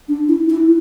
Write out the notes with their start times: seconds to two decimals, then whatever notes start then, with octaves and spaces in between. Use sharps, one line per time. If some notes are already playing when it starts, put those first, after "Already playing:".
0.09 D4
0.29 E4
0.50 E4